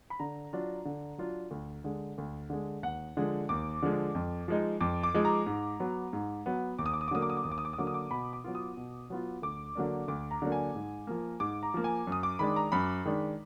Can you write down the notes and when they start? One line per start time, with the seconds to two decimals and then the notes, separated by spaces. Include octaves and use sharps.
0.10 B5
0.19 D3 A#5
0.53 F#3 D4 F4
0.85 D3
1.18 F#3 D4 F4
1.51 D2
1.84 D3 G#3
2.18 D2
2.50 D3 G#3
2.83 D#2 F#5
3.17 D3 F3 G#3
3.49 D#2 D6
3.82 D3 F3 G#3
4.15 F2
4.48 F3 G#3 D#4
4.81 F2 D6
5.03 D6
5.14 F3 G#3 D#4
5.25 A#5
5.46 G#2
5.80 F#3 B3
6.13 G#2
6.46 F#3 B3
6.78 D#2 D6
6.86 D#6
6.93 D6
7.01 D#6
7.08 D6
7.11 D3 F#3 A#3 D#6
7.22 D6
7.30 D#6
7.37 D6
7.43 D#2 D#6
7.51 D6
7.58 D#6
7.65 D6
7.73 D#6
7.78 D3 F#3 A#3 D6
7.87 D#6
7.94 D6
8.11 B2 B5
8.33 D6
8.44 F#3 B3 F4
8.55 D#6
8.77 B2
9.10 F#3 B3 F4
9.42 D2 D6
9.75 D3 F#3 A#3 D4
10.08 D2 D6
10.31 A#5
10.42 D3 F#3 A#3 D4
10.52 G#5
10.75 G#2
11.07 F3 A#3
11.40 G#2 D6
11.63 A#5
11.74 F3 A#3
11.84 G#5
12.07 F#2
12.12 D#6
12.23 D6
12.39 D#3 G#3 D4 B5
12.56 A#5
12.72 F#2 B5
13.05 D#3 G#3 D4